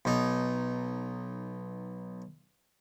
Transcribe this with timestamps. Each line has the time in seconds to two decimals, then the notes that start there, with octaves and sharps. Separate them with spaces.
0.05 B1 D#4